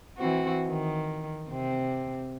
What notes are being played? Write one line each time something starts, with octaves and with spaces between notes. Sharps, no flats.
E3 C4 F#4
D#3
C3 C4